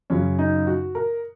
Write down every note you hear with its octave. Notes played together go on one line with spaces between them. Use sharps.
F#2 C#3 F#3 C#4
D#4
F#4
A#4